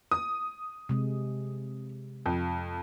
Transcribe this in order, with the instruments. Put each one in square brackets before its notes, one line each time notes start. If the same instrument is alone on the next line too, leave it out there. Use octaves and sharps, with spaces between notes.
[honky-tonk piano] D#6
[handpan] C3 G#3
[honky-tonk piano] F2